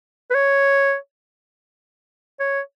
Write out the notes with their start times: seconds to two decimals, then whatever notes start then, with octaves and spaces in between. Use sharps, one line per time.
0.31 B4
0.35 C#5
2.40 C#5